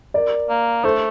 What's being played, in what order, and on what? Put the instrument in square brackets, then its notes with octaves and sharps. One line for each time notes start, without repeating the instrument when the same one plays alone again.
[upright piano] A#4 D5
[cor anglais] A#3
[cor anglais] A3 [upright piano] A4 C5